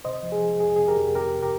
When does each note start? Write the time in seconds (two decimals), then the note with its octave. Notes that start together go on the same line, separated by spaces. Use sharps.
0.05 C3 C5 D#5
0.23 F3
0.32 G#4
0.41 F3
0.60 F2 G#4
0.76 C3 G#4
0.88 G4 A#4
0.98 F2
1.15 C3 G4 A#4
1.34 C3
1.42 G4 A#4